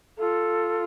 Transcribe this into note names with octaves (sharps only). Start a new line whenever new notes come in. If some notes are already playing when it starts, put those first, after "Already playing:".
F4 A4